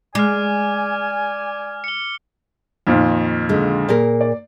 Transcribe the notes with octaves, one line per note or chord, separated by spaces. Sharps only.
G#3 D5 G#5 D6 F6
C#7 G7
F2 A#2 D#3
D3 G#3
A#2 G#4 A#4
D5